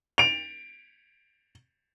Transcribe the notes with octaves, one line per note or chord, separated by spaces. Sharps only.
D7 F7